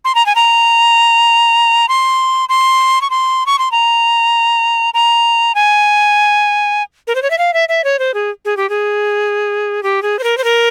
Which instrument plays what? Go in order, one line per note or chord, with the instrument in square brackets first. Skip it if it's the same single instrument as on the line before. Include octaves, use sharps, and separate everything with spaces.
[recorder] C6
A#5
G#5
A#5
C6
C6
C#6
C6
C#6
C6
A#5
A#5
G#5
A#4
C5
C#5
E5
F5
E5
E5
C#5
C5
G#4
G#4
G4
G#4
G4
G#4
C5
A#4
C5
A#4